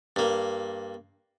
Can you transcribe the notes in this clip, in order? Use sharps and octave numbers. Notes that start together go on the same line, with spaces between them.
G2 A#3